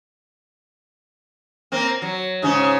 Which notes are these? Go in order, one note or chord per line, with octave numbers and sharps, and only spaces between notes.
A#3 C4
F#3
G#2 C#3 C#4